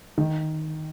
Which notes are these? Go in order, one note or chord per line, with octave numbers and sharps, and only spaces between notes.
D#3